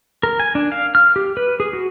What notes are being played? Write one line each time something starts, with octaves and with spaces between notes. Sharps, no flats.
A#4
G#5
D4
F5
F6
G4
B4
G#4
F#4